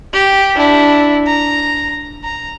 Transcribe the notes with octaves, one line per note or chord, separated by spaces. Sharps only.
G4
D4 E4
A#5
A#5